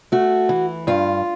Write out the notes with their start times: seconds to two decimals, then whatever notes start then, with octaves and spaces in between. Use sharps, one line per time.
0.12 A3 F#4
0.49 E3
0.87 G2 F4